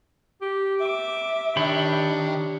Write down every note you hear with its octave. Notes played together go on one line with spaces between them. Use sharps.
G4
E5 D6
D#3 D4 G4 C#5 B5